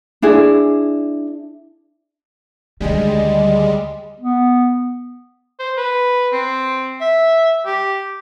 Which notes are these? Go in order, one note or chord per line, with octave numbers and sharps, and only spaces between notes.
D4 E4 G#4
D2 D#3 G3 G#3 D#5
B3
C5
B4
C4
E5
G4